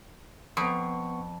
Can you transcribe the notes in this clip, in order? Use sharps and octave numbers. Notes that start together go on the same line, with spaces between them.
F2 B3 C#6